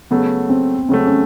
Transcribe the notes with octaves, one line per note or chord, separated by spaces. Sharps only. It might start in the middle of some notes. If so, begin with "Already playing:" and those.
C#3 F#3 A3 B3
C4
C#3 F#3 A3 C4
C#4